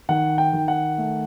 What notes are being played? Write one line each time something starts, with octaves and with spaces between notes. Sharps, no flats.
D#3 F#5
G5
D#3
F#5
A3